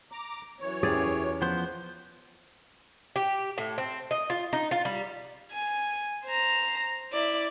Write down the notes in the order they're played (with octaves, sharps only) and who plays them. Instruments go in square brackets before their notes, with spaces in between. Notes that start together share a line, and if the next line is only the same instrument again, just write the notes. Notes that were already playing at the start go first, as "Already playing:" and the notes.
[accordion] A#5 D6
F#2 E3 C#5
[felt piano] E2 C#4 G4 [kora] G#4 D5
[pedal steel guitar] F3 B3 C5 [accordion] G6
[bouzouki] G4
A2
C4
D#5
F4
D#4
F4
G3
[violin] G#5
C5 A#5
E4 D5